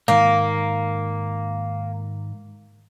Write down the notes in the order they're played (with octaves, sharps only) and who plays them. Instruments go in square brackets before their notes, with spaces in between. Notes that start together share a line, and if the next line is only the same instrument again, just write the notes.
[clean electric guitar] G#2 D#3 [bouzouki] A#3